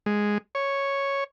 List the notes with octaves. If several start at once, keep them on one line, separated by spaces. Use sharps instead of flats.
G#3
C#5